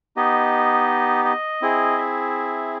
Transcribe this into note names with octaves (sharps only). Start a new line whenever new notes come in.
B3 D#4 G4 D#5
D#5
C4 E4 G#4
E5